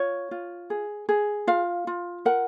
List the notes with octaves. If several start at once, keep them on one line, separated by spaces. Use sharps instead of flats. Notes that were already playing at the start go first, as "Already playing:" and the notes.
Already playing: F4 C#5
F4
G#4
G#4
F4 F5
F4
A#4 F#5